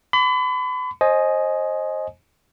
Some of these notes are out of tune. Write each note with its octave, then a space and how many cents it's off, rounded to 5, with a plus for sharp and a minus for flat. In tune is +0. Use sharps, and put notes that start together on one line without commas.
B5 +35 D6 -40
C5 +25 D#5 +0 G#5 +20